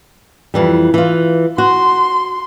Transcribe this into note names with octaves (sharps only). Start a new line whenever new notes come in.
F2 E3 G3
E3 F4
F#4 C6